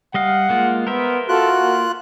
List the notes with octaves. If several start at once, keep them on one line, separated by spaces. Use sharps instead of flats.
G3 D#5 F5 F#5
G#3 A#3 F4
B3 A#4 C5 E5
F4 F#4 A4 F#6
A#3